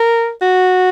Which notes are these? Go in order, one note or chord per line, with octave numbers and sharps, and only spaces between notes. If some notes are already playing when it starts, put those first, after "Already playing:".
Already playing: A#4
F#4